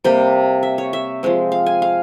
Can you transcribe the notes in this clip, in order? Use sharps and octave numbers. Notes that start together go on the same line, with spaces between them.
C3 G3 A#3 G5
E5
C#5
E5
F3 G#3 C4
F5
G#5
F5